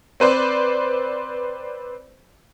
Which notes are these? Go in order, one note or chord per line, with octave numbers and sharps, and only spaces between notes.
C4 B4 C5 D5